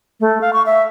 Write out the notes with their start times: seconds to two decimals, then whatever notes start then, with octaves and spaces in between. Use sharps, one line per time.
0.20 A3
0.41 F5
0.53 C#6
0.66 E5